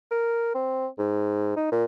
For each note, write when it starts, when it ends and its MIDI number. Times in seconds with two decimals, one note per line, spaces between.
0.11 0.52 70
0.55 0.87 60
0.98 1.55 44
1.56 1.69 63
1.72 1.85 46